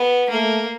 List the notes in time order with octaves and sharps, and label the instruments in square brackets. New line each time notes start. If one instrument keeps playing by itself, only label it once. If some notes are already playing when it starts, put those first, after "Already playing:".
Already playing: [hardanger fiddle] B3
[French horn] A3 [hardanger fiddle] A#3